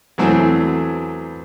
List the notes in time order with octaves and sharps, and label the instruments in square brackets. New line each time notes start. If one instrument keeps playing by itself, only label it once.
[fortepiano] E2 E3 F#3 A3 C4 G#5